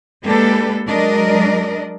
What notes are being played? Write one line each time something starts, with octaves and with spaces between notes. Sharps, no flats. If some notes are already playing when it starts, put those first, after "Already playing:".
G#3 A#3 D4 G4 A4 B4
F#3 G#3 D4 A#4 D5 D#5